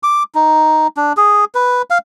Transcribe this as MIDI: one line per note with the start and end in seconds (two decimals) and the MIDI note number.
0.03 0.23 86
0.35 0.87 63
0.97 1.13 62
1.17 1.45 68
1.55 1.82 71
1.90 1.98 77